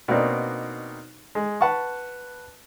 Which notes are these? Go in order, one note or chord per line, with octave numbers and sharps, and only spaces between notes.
B2 A#3 C4 D4 D#4 F#4
G#3
B4 F#5 A5 C#6